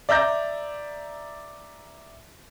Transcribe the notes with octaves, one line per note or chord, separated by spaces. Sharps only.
D5 E5 A#5 E6 G6 A#6